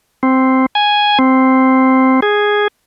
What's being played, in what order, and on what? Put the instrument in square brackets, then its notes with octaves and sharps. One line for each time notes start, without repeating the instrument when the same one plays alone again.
[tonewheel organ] C4
G#5
C4
G#4